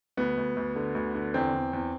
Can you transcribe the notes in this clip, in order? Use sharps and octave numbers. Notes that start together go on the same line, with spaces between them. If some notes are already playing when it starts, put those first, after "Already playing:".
D2 B3
D2
D2
D3
D2
D3
E2 C4
E2
E2